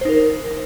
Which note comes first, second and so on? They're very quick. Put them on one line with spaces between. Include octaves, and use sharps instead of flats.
C5 D#4 A#4